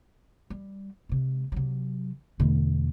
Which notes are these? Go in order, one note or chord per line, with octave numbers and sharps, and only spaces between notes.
G3
C3 G#3
C3 F#3
E2 B2 D3 A3 B3